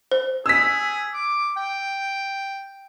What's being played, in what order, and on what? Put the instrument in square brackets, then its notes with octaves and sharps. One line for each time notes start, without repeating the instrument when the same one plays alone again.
[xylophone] C5
[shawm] G#4 [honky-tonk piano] E6 B6
[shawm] D6
G5